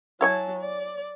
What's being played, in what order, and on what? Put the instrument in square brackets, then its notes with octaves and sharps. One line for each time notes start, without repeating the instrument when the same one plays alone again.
[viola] F#3 A5 [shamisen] E4 C#5 G#5
[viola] D5